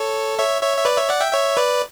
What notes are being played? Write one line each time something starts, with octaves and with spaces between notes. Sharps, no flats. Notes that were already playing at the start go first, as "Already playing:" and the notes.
Already playing: A4 C#5
C#5 E5
C#5 E5
E5
B4 D5
C#5 E5
D5 F#5
E5 G5
C#5 E5
B4 D5